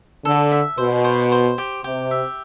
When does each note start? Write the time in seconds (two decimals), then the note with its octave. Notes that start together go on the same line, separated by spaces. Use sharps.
0.25 D3 A4
0.52 E5
0.78 B2 C5
1.04 C5
1.32 C5
1.58 G4
1.84 C3 G4
2.11 E5